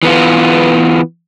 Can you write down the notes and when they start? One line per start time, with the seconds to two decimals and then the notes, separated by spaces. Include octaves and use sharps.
0.03 E3 B3 F4